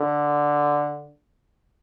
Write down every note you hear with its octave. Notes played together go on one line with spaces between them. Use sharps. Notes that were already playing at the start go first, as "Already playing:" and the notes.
Already playing: D3